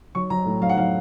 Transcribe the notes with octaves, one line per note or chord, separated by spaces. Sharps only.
F#3 C#6
F#3 A#5
A2
F#3 F5
F#5
F#3 F5